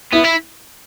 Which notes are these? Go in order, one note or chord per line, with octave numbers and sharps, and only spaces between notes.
B3 E4
E4